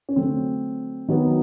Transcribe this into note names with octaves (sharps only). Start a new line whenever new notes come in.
C#4
D3 F#3 A3 C4
D#3 F#3 B3